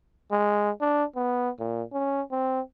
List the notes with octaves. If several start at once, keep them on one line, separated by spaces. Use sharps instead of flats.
G#3
D4
B3
A#2
C#4
C4